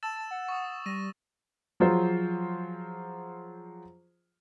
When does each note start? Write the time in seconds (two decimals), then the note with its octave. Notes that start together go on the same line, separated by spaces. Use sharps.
0.03 A5 E6 A6 E7
0.31 F#5
0.48 C#6 D#6
0.86 G3 A#6 D#7
1.80 F3 F#3 F4 G#4 C5